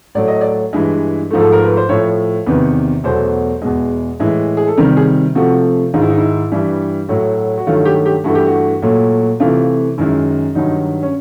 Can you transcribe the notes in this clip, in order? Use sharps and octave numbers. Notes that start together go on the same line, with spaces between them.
A2 F#3 A3 D5
D#5
D5
G2 E3 G#3
G#2 F3 A3
A4
A#4
B4
C5
A2 F3 A3 C#5
E2 C3 D#3 B4
E2 B2 F#3 A3 C5
E2 B2 G#3
A2 E3 G#3
G#4
A4
C3 D#3 G3 A#4
G#4
C3 F3 A3 F#4
G#2 D#3 G#3 F4
E4
D#4
E4
G2 E3 G3
A2 F#3 A3 F#4
F#4
G2 D#3 F#3 A3 F4
G4
G4
G2 E3 A3 F#4
G4
F#4
A#2 F#3 A3
C3 E3 A3 F4
F#2 D#3 G#3 E4
G2 D#3 F#3 D#4
C#4